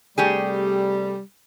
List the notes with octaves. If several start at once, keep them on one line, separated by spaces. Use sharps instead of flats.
C3 G3 A3 G4 G#4